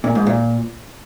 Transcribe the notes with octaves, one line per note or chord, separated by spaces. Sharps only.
A#2
G#2
A#2